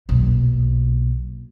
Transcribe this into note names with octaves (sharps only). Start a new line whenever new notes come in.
B1 A#2